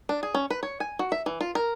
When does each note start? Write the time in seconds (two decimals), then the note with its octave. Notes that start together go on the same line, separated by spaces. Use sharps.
0.09 D4
0.23 G#4
0.35 C#4
0.51 B4
0.63 C#5
0.80 G#5
0.99 F#4
1.12 E5
1.26 E3
1.41 F4
1.55 A#4